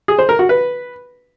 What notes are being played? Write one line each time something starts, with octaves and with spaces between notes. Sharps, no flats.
G#4
C5
A#4
F#4
B4